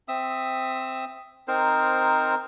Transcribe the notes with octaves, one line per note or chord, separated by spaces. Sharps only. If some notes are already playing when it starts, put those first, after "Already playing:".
C4 E5 D#6 E6
C4 D#4 A#4 C5